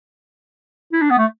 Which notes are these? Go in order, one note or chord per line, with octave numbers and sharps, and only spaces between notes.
E4
D4
B3
A3